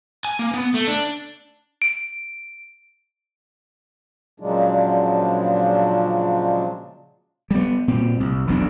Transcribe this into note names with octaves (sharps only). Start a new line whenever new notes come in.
G#5
A#3
B3
A3
D4
D7
A#2 C#3 F3 F#3 G#3 D4
G3 B3
A#2 C4
C2
E1 B1 F2 D4